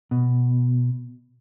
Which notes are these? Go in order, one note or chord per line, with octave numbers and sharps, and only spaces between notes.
B2